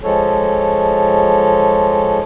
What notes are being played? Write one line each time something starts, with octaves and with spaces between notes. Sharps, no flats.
F3 G#3 A4 C#5